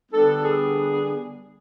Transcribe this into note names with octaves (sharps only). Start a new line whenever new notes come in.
D3 G3 B3 D4 A4
G#4